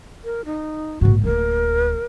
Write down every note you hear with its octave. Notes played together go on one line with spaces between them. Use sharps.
A#4
D#4
A#1 G#2 F#4
D1 A#3 A#4